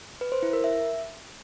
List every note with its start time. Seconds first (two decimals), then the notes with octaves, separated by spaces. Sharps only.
0.21 B4
0.32 C5
0.43 E4
0.53 A#4
0.64 E5